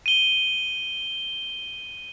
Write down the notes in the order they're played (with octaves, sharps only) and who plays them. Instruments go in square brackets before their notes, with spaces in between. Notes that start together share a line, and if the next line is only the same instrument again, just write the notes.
[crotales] D#7 G7